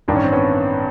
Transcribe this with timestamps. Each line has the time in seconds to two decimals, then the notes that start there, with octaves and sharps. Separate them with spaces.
0.08 A1 G2 D#3 D4
0.16 C#4
0.24 C4
0.32 B3 C#4